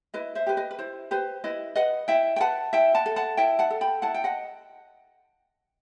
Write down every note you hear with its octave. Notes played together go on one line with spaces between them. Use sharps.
E4 B4 D#5
C5 E5
G4 B4
B4 D#5
B4
E4 C5
G4 B4 C5
E4 B4 D#5
B4 D#5 F#5
E4 E5 G5
G5
B4 F#5 A5
E4 E5 G5
F#5 A5
A4
F#5 A5
E4 E5 G5
F#5 A5
A4
G5 B5
E4 F#5 A5
G5
D#5 F#5